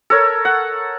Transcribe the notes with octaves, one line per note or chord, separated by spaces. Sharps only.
A4 A#4 C#5
F#5